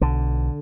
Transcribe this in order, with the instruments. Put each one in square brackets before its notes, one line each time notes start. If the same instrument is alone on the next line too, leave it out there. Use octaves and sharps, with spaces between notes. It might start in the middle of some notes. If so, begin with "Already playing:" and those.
[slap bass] B1 D3